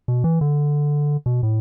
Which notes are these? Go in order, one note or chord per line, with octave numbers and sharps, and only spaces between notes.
B2
E3
D3
B2
A2